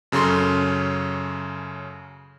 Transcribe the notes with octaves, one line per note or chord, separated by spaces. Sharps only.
F#2 C#3 C#4 A4 C6